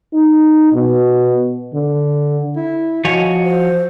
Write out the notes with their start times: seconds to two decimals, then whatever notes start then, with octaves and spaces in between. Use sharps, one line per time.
0.13 D#4
0.73 B2
1.74 D3
2.57 E4
3.05 F3 F#4 C#5 D#5 G#5
3.44 C5